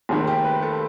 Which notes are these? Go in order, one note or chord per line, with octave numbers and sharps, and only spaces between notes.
F1 D#2 D#3 G#4
G4
B4
A4